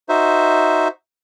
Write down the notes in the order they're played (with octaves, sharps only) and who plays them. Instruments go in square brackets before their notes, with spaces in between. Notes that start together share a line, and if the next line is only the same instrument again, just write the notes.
[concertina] D#4 F#4 C5 E5